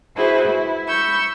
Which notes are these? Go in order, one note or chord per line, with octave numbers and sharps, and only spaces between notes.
E4 F#4 G#4 B4 C5
E4
B5 C#6 E6 G6